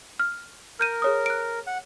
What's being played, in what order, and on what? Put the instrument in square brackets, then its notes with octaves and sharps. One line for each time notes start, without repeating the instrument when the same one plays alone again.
[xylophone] F6
[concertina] A#4 [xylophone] F6 G6 D#7
[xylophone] G#4 C#5 D#6
F#6 D7
[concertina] F#5